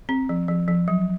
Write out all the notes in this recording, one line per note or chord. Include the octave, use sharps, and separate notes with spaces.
C4
F3
F3
F3
F#3